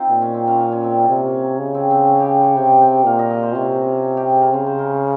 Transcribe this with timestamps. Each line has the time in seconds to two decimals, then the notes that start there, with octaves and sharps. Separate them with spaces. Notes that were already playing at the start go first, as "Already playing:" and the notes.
Already playing: C4 D#4 F4
0.10 A#2
0.22 C#4
0.34 C4
0.47 C#4
0.60 C#4
0.72 C#4
0.84 C4
0.96 C#4
1.09 C3
1.58 C#3
1.74 C4
1.91 C4
2.07 C#4
2.20 G4
2.44 C#5
2.56 C3 G5
2.81 G5
3.05 A#2 F5
3.19 D#5
3.30 D#5
3.43 C5
3.55 C3 C#4
4.17 G4
4.29 G#4
4.41 A#4
4.54 C#3 C5
4.66 C5
4.79 A#4